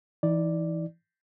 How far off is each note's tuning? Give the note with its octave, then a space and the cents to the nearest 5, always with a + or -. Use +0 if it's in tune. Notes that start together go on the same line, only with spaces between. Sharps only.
E3 +15 D#4 +45 D5 +0